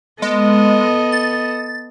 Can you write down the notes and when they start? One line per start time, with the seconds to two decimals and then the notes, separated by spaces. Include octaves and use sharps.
0.22 G#3 B3 A4 D#5
1.12 A6